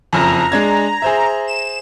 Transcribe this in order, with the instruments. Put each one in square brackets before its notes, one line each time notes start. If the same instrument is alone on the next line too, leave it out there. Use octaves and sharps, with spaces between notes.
[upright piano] F#1 F2 [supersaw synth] A#5
[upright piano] G#3 D4 G#6
G#4 C5 E5
[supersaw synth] E7